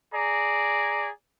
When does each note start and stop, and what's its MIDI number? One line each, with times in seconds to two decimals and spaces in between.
0.15 1.11 68
0.15 1.11 74
0.15 1.11 82